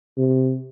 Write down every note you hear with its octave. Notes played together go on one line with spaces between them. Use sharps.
C3